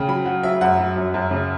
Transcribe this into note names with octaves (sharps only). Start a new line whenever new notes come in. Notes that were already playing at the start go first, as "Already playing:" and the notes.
Already playing: C#3 G5
F#3 B5
F#3 F#5
F#3 E5
F#2 F#5
F#3
F#2
F#2
C#3